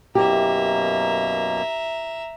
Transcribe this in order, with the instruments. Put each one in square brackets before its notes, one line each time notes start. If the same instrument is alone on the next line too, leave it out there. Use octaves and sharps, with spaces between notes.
[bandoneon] F#2 B2 A#3 [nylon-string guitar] E4 G4 [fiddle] E5 A#5